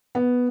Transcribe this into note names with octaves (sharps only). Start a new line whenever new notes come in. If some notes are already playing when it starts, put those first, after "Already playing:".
B3